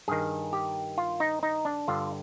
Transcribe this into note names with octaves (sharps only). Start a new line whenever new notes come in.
G2 D#3 G#4
G4
F4
D#4
D#4
D4
G2 D3 F4